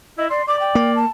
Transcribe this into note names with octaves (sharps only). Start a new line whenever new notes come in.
E4 D#5
D5 C6
D5 D6
G5
A#3
A5